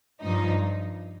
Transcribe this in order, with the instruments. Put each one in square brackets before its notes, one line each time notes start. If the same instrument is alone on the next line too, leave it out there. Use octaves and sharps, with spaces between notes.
[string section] G2 F3 D#4